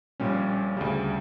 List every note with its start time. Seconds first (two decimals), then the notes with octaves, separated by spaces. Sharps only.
0.20 A#1 A#2 G3 C#4
0.77 D2 C#3 G3